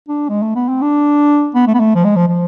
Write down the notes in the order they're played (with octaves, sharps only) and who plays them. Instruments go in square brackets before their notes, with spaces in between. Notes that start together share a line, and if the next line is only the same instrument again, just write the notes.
[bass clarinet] D4
G#3
A3
B3
C4
D4
B3
A3
B3
A3
F3
G#3
F3
F3